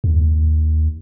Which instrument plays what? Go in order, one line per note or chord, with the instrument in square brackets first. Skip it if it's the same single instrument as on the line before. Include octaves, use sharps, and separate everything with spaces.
[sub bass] D#2